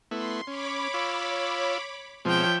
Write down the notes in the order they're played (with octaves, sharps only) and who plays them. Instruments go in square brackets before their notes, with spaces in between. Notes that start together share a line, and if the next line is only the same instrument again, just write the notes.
[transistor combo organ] A3 B3 E4 [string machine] C6
[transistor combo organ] C#4 [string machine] C#5 B5 D6
[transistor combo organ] F4 E6
[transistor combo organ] B2 G#3 C4 [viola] F3 G5 [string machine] C#5 E5